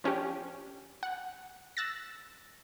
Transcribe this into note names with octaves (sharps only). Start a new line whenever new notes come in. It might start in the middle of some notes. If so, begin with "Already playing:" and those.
F3 C#4 D4 G4
F#5
E6 F#6 A6 A#6